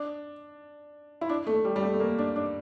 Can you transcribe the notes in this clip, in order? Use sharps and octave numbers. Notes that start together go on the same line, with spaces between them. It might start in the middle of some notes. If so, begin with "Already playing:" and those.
Already playing: D4
E4
D4
A3
G3
G3
A3
A3
A#3
D4
D4